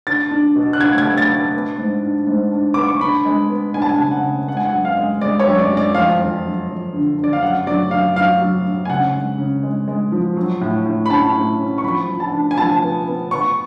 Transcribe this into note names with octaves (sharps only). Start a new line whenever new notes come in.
D4 A6
D4
B2
F#6
D4 G#6
G#6
A3
A6
D4
B3
G#2
D4
G#2
D4
B3 D6
C#6
D4 B5
G#3
B3
D4 G#5
A5
G#5
C#3
F#5
C#3
G#3 F#5
G#5
F#5
F#2
F5
G#3
G#3 D5
C#5
F#2
D5
G#3
D5
F2 F5
F2
F#3
F2
D3
D3
D5
F5
F#2 F#5
F#3 D5
F#2 F5
F#3 F5
F#3
F#3
G#5
C#3 F#5
G#3
C#3
G#3
G#3
F3
F#3
A2
A2
B5
C#4 A5
A2
C#4
C#6
F3 B5
F3
A5
D4
G#5
F3 A5
B3
B3
B3 C#6